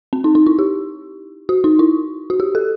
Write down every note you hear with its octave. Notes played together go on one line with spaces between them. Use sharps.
C4
D#4
D#4
E4
G4
F#4
D#4
E4
F#4
G4
A4